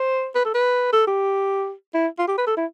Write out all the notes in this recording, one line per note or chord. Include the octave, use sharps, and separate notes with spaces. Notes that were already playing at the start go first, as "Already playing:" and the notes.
Already playing: C5
B4
A4
B4
A4
G4
E4
F4
G4
B4
A4
E4